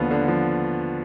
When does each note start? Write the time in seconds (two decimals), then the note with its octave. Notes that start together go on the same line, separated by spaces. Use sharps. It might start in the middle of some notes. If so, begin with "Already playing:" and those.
Already playing: D#2 D3 F3 B3
0.11 D3
0.28 F3